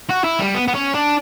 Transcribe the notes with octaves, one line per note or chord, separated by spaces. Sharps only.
F#4
E4
G3
B3
B3
C#4
D4